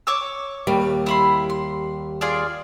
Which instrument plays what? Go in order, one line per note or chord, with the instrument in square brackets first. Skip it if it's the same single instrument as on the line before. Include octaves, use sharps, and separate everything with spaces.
[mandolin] C#5 D6 E6
[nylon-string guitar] D#2 G3
[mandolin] E4 B5 C6
C6
F4 G#4 D5